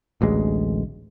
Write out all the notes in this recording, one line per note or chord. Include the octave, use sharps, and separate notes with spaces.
D1 A1 D2 G#3